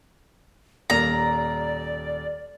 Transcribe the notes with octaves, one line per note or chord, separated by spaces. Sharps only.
D#1 A#3 D5 A#5 F7